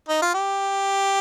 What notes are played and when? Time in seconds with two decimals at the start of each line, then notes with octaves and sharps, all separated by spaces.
0.09 D#4
0.22 F4
0.34 G4